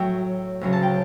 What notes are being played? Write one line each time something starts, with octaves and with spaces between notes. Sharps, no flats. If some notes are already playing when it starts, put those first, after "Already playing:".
Already playing: A2 F#3 E5 G5
D2 C#3 F#3
A5
G5